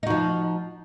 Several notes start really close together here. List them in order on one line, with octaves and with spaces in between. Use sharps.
D#4 F#4 F3